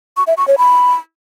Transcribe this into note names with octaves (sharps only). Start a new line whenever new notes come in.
C#6
E5
C#6
C#5
B5